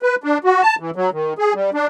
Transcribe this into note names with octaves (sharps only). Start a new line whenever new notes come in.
B4
D4
F#4
A5
E3
F#3
D#3
G#4
G3
D4